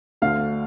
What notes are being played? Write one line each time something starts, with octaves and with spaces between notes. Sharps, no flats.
D2 D3 F5